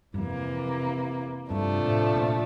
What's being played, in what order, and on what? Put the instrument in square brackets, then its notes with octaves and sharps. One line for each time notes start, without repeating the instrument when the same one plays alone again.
[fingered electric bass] G2
[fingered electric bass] F2 [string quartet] C3 E3 A#3
[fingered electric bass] G2 [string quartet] C3 F3 A3 D4
[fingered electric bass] A2
A#2